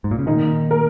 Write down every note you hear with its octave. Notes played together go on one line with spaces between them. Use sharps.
G#2
A#2
C#3
A#2 D#3 D#4
A#4